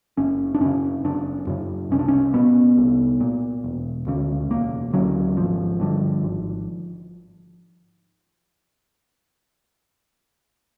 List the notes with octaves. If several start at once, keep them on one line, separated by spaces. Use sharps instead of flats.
F#1 C#4
D4
F#2 C#3 C#4
F#1 D4
F#2 C#3
C2 C#4
D4
C#4
A#2 B3
C2
A#2
E1
D2 C#3
E1 A#3
D2 C#3 F#3
G#1 F3
G2 D3
G#1